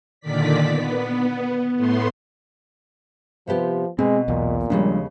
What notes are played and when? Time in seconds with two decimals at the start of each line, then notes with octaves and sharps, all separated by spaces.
0.20 A#2 D3 D#3 D5 B6
0.66 B3
1.77 A2 A3 B3 C6
3.47 C3 F3 B3 G4
3.99 B2 G#3 C4
4.28 B1 E2 A#2
4.70 D#2 C#3 F3 G3 G#3 D4